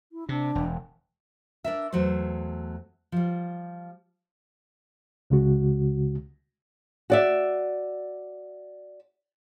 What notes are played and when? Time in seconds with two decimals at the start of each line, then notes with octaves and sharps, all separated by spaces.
0.12 E4
0.29 C3 D4
0.55 E1
1.64 D4 A#4 E5
1.93 E2 F#3 A3 C5
3.12 F3 G3
5.30 C#2 C#3 G#3 F#4
7.10 F#4 D5 E5